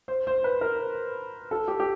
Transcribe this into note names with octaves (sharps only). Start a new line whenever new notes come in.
C5
C5
B4
A#4
A4
G4
G4